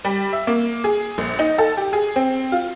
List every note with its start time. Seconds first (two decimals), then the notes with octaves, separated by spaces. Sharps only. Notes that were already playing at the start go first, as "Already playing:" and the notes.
0.04 G3
0.33 E5
0.47 A#3
0.84 G#4
1.18 A#1
1.39 D#4
1.58 A4
1.77 G4
1.93 G#4
2.16 C4
2.52 F4